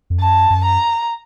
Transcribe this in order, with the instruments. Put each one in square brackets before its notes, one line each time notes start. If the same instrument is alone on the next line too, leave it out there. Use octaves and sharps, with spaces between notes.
[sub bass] F2
[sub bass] F#2 [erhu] A5
[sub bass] F#2
[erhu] A#5